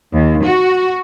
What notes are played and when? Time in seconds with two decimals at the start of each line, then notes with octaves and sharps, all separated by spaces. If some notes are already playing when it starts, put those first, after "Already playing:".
0.13 D#2
0.45 F#4